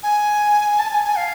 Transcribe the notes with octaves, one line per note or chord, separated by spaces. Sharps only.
G#5
A5
G#5
G#5
F5